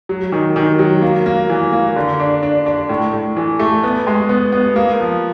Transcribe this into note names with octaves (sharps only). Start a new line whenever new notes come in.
F#3
D#3
D#3
F#3
A#3
A#3
E3
A#3
D3
D4
D4
D4
A2
A2
E3
A3
B3
G#3
B3
B3
A#3
F3